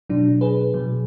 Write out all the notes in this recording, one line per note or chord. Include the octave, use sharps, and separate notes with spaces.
B2 F#3 D4
G#4 B4
B2 F#3